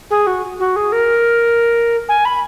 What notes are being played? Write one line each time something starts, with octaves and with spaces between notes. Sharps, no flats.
G#4
F#4
F#4
G#4
A#4
G#5
B5